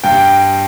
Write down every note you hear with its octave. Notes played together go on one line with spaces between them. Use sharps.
G2 G5